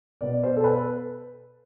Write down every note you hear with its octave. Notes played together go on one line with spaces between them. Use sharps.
B2 B3 D5
C5
A4
B4